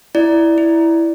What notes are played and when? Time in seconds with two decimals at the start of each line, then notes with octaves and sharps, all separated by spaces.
0.15 E4 D5
0.58 E4